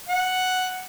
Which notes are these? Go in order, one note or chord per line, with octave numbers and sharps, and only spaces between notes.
F#5